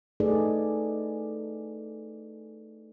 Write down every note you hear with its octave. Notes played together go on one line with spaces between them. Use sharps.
A3 D#4 G#4 A4 B4 D5